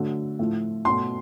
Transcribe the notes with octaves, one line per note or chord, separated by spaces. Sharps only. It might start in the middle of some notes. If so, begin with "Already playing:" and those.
Already playing: D3 F#3 A3
A2 F3 A3
B2 F#3 A3 C6